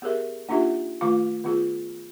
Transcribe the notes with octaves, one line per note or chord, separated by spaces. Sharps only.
B3 G4 G#4 A#4 E5
A#3 D4 D#4 F4 G4 E5
D#3 A3 F4 F5 D6
D#3 B3 F4 G#4